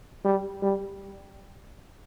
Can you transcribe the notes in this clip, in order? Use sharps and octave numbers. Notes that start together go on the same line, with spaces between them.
G3
G3